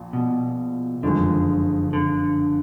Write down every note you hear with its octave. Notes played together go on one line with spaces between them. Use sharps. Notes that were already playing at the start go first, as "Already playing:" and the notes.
Already playing: A#1 A#2
B2
F#1 F2 D3 D#3 G#3
D3